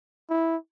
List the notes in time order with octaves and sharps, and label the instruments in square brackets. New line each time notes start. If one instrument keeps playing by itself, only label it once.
[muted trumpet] E4